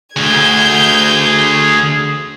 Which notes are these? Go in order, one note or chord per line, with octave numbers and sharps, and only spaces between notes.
D2 D3 G#4 G6 G#6
G#4